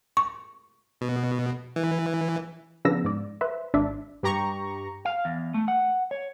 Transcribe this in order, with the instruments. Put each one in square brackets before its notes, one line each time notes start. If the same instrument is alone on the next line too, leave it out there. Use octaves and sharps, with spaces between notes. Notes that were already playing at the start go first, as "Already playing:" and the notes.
[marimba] C#6
[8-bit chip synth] B2
E3
[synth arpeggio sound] C#3 F3 B3 D4 E6 A#6
G#2 D5
B4 C5 E5
G#1 D4 D5 E5
[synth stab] G2 G4 A#5 C#6
[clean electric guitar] F5
E2
A3
F#5
C#5